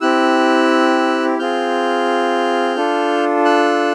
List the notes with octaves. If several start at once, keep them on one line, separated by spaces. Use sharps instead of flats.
C4 E4 G4 E6 F#6
C4 F4 G#4 F6 G6
D4 F4 A4
E6 F#6